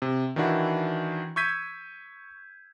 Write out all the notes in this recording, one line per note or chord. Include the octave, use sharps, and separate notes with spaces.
C3
D#3 E3 D4 E4 F#4
C#6 E6 G6 G#6 B6 D#7